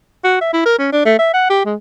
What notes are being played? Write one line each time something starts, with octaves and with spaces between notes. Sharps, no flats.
F#4
E5
E4
A#4
C#4
D4
A3
E5
F#5
G4
G#3